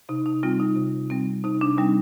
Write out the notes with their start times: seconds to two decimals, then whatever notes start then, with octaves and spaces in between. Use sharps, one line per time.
0.09 C3 D#4
0.26 D#4
0.43 G3 C4 F4
0.60 D#4
0.76 C3
1.10 G3 C4
1.44 C3 D#4
1.61 D4
1.78 G3 C4 D#4